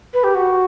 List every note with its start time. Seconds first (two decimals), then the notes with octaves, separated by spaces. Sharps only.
0.13 B4
0.24 G4
0.35 F#4